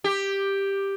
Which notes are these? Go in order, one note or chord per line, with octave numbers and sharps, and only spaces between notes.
G4